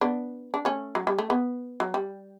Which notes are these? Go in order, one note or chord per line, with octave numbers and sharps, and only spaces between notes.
B3 D4
D4
A3 C#4
F#3
G3
A3
B3
F#3
G3